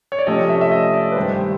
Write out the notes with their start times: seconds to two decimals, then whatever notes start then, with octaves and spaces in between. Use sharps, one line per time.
0.12 C#5
0.19 D5
0.27 C3 F3 A3 C#4 D#5
0.49 E5
0.61 E5
0.71 D#5
0.94 D5
1.12 B4
1.16 G2 D#3 G#3 C5